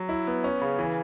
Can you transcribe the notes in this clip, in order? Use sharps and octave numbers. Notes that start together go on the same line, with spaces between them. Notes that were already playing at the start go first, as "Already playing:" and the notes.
Already playing: F#3
E4
B3
C#4
C#3
E3